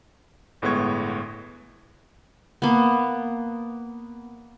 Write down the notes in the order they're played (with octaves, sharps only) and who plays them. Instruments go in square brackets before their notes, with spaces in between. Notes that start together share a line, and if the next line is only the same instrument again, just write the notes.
[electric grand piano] G1 A2 G#3 B3 C#6 G#6
[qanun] A#3 B3